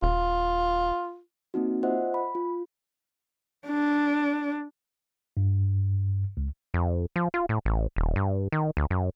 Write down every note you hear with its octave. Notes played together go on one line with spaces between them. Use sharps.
D#1 F4
A#3 C4 D#4 F#4
F4 C5 D#5 E5 F#5
B5
F4
D4
G2
C#2
F2
F3
F4
A2
A1
D#1
G2
D#3
D2
F#2